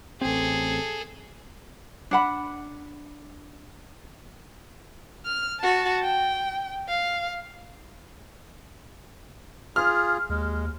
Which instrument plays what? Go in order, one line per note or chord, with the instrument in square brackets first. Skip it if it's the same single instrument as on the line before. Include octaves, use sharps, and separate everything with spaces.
[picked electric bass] A1 C4 [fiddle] G#4 A4
[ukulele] D4 F#5 B5
[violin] F6
F#4 A5
G5
F5
[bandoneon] F4 G#4 [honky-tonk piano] F6
[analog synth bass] D#2 [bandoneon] G#3